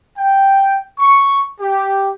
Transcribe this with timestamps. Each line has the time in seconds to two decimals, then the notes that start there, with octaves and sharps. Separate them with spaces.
0.18 G5
0.99 C#6
1.60 G4